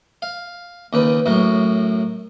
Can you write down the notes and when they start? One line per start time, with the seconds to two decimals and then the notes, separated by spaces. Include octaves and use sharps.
0.22 F5
0.93 D#2 C#3 B4
1.26 F#2 A2 F#3